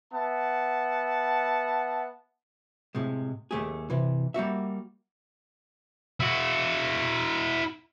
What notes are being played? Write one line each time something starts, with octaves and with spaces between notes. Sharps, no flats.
B3 E5 F#5 A5
A2 C3 G#3
D#2 A3 G4 G#4
C3 E3
G3 A#3 F#4 E5
E4 F#4